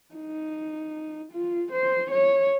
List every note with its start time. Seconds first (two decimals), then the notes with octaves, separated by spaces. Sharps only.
0.15 D#4
1.32 F4
1.71 C5
2.11 C#5